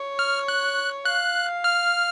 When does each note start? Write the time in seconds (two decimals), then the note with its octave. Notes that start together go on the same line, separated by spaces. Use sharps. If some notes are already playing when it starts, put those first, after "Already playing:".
Already playing: C#5
0.19 F6
0.48 F#6
1.05 F5 F#6
1.64 F6